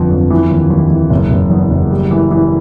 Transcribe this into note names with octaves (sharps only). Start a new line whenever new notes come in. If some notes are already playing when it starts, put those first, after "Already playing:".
Already playing: G1 F2 F3
F2
E3
D#2
D#2
E3
F#1
F#1
E2
F#1
G3
E3
E3